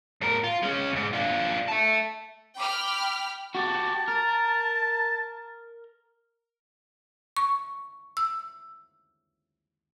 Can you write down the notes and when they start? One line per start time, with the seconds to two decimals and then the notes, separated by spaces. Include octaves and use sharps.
0.21 A2 A#4
0.44 F4
0.63 G#3 C#4
0.92 D2 G#2
1.13 D4 F4
1.68 E5 A5
2.57 G5 B5 D6 F6
3.55 F#4 G4 A5
4.08 A#4
7.37 C#6
8.17 E6